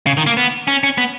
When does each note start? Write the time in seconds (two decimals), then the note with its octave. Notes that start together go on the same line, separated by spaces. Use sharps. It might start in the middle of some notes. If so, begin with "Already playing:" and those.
0.06 C#3
0.17 D#3
0.27 A#3
0.37 B3
0.68 C#4
0.84 C#4
0.98 B3